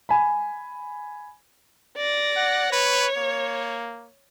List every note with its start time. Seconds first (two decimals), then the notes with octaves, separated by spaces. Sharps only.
0.09 G#5 B5
1.97 D5 A#6
2.36 F#5
2.73 B4 C#5
3.18 A#3